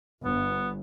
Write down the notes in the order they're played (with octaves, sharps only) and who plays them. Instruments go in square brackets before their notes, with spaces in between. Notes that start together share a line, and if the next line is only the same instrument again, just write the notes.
[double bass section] G1 [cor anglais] B3